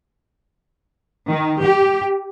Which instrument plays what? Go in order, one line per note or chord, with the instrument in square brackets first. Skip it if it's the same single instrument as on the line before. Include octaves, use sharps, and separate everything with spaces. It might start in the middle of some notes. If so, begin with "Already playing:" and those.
[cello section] D#3
G4